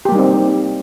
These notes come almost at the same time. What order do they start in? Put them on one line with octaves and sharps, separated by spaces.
G4 A#3 G3 D#4 C4